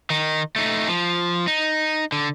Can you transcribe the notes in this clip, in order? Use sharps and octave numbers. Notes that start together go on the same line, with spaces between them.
D#3 D#4
A3 D#4
F3
D#4
D3